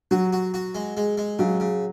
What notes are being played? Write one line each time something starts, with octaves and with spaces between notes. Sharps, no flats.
F#3 F#4
F#4
F#4
G#3
G#3
G#3
C#3 F#3
C#3